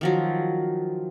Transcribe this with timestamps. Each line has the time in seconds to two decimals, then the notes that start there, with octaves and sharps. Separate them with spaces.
0.01 D#3 F3 F#3